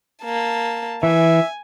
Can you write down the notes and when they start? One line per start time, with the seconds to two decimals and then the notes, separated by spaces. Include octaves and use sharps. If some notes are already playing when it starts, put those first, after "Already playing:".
0.24 A#3 A5
1.03 E3 E5 G#5